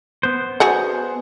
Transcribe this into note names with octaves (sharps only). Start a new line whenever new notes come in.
B3 C5
F#3 G#4 F#5